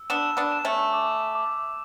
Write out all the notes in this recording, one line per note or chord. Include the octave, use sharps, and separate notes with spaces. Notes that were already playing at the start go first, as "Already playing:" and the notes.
Already playing: E6
B3 D4 E7
B3 D4
E7
A3 C#4
D6
D6